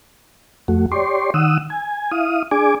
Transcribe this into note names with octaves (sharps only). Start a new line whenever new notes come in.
F2 A3 F#4
G4 C#5 D5 C6
D#3 F#5 D#6 E6
G#5
E4 F5 D#6
D4 G#4 G#5 D6